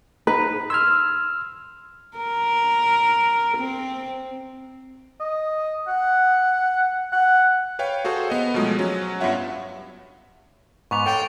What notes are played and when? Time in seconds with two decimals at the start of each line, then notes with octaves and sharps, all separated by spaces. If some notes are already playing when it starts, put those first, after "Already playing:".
0.27 D#4 B4 A#5 F#6
0.70 C6 E6 F6 G#6
2.18 A#4
3.57 C4
5.20 D#5
5.88 F#5
7.12 F#5
7.79 B4 C#5 F5 G5
8.05 F#4 G#4 A4 C5
8.30 B3 D#5
8.54 B2 F3 F#3 G#3 A3
8.79 F#3 C#4
9.20 G2 B3 F4 C#5 E5 F#5
10.91 G#2 B3 C#6 D6 F7
11.06 A4 C#5 F5 G5